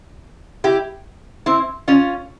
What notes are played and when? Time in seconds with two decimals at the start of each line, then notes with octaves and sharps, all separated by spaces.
0.64 E4 G4
1.46 C4 E4
1.88 C#4 F4